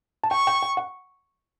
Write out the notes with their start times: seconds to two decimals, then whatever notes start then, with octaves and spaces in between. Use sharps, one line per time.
0.24 A5
0.31 G5 C#6
0.47 G5
0.63 G5
0.77 F#5